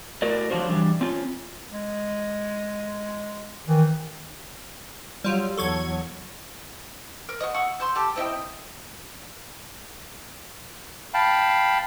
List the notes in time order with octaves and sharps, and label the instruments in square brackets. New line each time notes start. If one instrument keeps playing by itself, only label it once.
[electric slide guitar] A2 F#4 A#4 D5
F3 F#3 D4 F4 F#4 C5
E3 G3 D4
C4 C#4 F4
[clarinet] G#3
[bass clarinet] D#3 [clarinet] E3
[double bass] F#3 [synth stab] G3 F4
[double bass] E2 F#3 [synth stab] A4 C#6 G#6
[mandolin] A#4
F#4 D#5
F#5 C#6 E6
C6 E6 G6
G4 A4
C4 E4 D#5 G5
[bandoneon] F5 G5 A5 B5